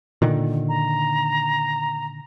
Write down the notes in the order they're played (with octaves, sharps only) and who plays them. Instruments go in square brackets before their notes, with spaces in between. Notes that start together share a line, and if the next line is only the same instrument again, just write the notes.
[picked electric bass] A#2 D3 D#3
[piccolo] A#5